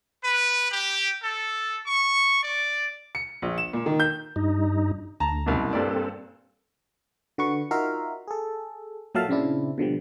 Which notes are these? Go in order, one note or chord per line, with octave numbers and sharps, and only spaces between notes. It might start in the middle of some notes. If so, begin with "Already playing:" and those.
B4
G4
A4
C#6
D5
C#7
A#1
E7
A#2
D#3
G6
G2 D#4
D2 A5 A#5
C2 F#2 B2
G2 A#2 C4 A4 D5
D3 F#4 B4 C#6
D#4 F4 F#4 A#4 E5 F5
G#4 A4
A#2 F#3 A4 E5 F5 A5
A#2 C#3 C4 D4 E4
B2 D3 F3 G3